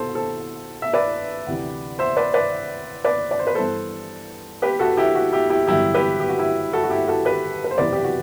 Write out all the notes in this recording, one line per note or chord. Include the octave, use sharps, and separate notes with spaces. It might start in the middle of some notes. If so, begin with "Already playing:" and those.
Already playing: C2 B2 A4 C5
A4 C5
E5
B4 D5
D2 C3 E3
C5 E5
B4 D5
B4 D5
B4 D5
D5
C5
B4
G2 E3 B3 A4 C5
G4 B4
F#4 A4
E4 G4
F#4
E4 G4
E4 G4
A1 G2 D3 F#3 B3 E4 G4
G4 B4
G4
F#4
E4 G4
F#4 A4
F#4
E4 G4
F#4 A4
G4 B4
B4
C5
F#1 E2 C3 E3 B4 D5
G4
F#4